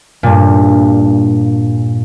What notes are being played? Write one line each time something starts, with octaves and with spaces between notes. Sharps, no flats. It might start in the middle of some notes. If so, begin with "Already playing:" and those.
G2 A#2